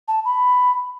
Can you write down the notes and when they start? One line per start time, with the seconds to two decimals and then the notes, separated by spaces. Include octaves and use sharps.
0.08 A5
0.25 B5